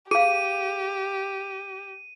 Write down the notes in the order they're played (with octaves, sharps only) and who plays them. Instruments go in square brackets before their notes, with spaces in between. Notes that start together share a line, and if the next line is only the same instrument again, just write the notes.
[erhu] G4 [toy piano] G#4 F5 [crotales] D#7